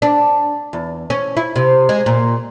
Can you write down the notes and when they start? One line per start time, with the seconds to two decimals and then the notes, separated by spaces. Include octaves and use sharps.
0.02 D4
0.73 E2
1.10 C#4
1.37 E4
1.56 C3
1.89 G#3
2.06 A#2